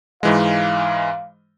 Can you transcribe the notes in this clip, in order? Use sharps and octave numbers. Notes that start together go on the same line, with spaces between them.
G#2 E3 G#3 F5